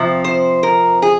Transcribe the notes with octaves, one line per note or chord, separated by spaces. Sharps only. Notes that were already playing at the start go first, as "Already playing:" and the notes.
Already playing: F2 C3 F3
C5
A#4
G#4